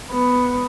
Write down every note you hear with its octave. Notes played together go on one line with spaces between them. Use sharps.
B3